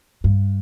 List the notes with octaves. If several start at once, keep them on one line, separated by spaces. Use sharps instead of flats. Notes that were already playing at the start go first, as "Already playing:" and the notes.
G2